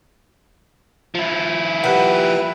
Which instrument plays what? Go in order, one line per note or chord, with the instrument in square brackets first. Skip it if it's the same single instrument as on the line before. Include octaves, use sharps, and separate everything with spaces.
[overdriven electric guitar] F3 E4
[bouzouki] G3 A#3 F#5 [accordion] B4